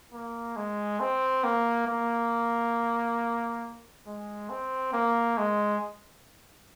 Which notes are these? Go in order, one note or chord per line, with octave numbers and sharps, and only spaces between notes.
A#3
G#3
C4
A#3
A#3
G#3
C4
A#3
G#3